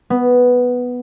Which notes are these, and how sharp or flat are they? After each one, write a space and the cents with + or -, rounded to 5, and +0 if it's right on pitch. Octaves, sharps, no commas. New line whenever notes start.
B3 +0